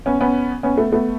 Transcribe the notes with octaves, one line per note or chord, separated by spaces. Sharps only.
B3 C#4
B3 C#4
B3 C#4
A3 B3
A3 B3